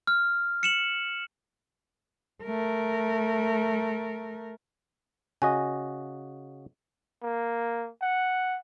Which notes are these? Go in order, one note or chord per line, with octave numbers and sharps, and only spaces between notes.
F6
C#7 E7 F#7
A3 A#4
C#3 F#4 D#5 G#5
A#3
F#5